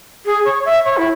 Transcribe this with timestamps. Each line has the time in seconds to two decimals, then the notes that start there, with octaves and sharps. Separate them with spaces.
0.26 G#4
0.45 C#5
0.65 E5
0.85 C#5
0.97 E4